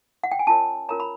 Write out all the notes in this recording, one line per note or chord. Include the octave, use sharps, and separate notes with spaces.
F#5
G5
G#5
C#4 F4 A#4 C#5 A5
C#4 F4 A#4 C#5 A#5
B5